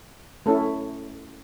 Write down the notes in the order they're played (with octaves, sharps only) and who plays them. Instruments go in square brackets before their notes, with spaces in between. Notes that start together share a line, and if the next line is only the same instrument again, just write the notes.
[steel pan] A3 C#4 E4 A4